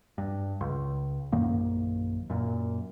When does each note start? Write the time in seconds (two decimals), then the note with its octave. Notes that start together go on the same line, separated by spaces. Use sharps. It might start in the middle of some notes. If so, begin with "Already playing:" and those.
0.18 G2
0.61 C#2
1.32 A#1 F#2 D#3 A#3
2.30 F#2 A#2